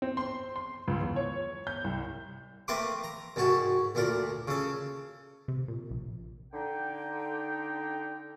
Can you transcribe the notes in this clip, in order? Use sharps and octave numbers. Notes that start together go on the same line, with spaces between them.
C4
C6
C6
C#2
E2
C#5
G6
C2
A3 A#3 C4 B4 C6 D6
A#5
C2 G#2 F#4 A5
D2 A#2 A#4 D5
C#3 A4
C3
A#2
A#1
D3 D#4 G5